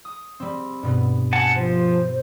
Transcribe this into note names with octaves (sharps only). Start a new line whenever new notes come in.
D#6
G3 C4
G2 B2 B3
F#5 G#5 A5
F3 C5